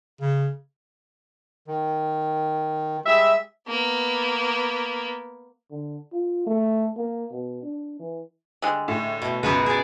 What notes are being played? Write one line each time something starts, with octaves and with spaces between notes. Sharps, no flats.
C#3
D#3
G3 G#3 E5
A#3 B3
D3
F4
A3
A#3
B2
D4
E3
D3 G3 G#3
A2
B2
C#2 F#2 B3 F#4 B4
G#4 D5